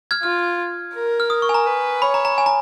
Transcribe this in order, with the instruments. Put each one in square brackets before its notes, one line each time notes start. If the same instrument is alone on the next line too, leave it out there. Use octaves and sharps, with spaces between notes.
[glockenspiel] F6 G#6
[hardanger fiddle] F4 [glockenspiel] F6
[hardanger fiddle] A#4
[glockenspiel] F6
D#6
C#6
G#5
A#5
[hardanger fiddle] B4
[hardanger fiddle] C#5 [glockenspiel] B5
[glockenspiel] A#5
A#5
G#5
A#5